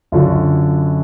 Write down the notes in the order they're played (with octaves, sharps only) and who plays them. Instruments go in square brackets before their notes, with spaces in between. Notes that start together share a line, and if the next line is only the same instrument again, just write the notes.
[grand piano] F#2 D3 F#3 F4